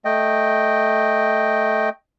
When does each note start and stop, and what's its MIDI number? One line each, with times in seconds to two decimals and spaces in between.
0.05 1.89 57
0.05 1.89 75
0.05 1.89 79